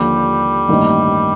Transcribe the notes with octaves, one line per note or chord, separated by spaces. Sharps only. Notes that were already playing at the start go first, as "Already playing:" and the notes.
Already playing: D#2 D3 F3 G3
A1 G2 D#3 A#3 D#4